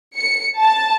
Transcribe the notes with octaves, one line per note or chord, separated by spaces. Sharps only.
C#7
A5